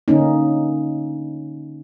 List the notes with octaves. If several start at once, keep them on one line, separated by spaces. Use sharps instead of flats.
D3 A#3 C#4 D#4